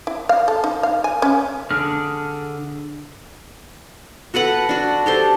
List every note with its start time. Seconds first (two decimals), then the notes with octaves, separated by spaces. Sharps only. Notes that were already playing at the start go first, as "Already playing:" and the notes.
0.07 E4
0.29 F5
0.48 A4
0.64 D#4
0.83 F5
1.04 G#5
1.22 C#4
1.71 D3 D4 G#4 F6
4.34 F#4 A4 B4 F#5
4.69 D4 F#4
5.06 G4 A4 C5